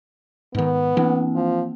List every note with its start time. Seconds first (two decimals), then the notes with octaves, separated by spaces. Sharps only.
0.55 G#2 D#3 B3
0.97 E3 A#3 C4
1.35 F3